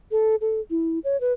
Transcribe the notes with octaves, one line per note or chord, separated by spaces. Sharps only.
A4
A4
E4
C#5
B4